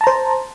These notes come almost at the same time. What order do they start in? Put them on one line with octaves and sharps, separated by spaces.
A5 A#5 C5